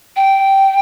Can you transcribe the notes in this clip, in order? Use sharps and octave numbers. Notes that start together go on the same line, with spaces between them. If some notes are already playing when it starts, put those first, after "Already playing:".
G5